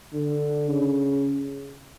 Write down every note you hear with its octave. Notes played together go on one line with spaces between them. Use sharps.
D3
C#3